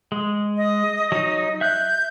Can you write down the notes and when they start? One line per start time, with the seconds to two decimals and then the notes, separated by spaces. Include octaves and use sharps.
0.12 G#3
0.57 D#5
1.12 F#3 D#4
1.61 E5 F#6 G6